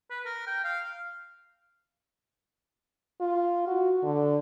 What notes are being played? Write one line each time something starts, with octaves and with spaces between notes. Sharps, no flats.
B4
A#4
G5
F5
F4
F#4
D3